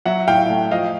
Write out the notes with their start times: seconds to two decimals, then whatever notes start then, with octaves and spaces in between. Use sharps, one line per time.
0.06 F#3 E5 F#5
0.27 A2 F5 G5
0.50 A3
0.71 F3 D#5 F5